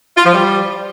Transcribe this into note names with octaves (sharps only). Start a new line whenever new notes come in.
F4
F3
G3